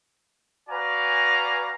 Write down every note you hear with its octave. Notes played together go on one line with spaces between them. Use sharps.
F#4 B4 D5 F5 G#5 A#5